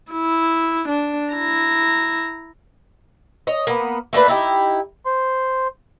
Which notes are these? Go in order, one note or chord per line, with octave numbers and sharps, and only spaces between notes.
E4
D4
E4 A#5
C#5 D#5
A#3 B3
A3 A#3 D4 B4
D#4 E4 G4
C5 C6